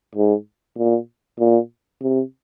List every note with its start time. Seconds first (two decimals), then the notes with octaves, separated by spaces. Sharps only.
0.15 G#2
0.78 A#2
1.39 A#2
2.02 C3